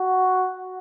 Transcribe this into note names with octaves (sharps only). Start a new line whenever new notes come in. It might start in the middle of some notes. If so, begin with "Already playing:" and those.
Already playing: F#4